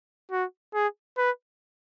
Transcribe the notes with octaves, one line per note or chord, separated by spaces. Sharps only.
F#4
G#4
B4